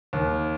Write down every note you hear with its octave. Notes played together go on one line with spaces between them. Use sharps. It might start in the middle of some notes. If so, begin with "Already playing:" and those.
D#2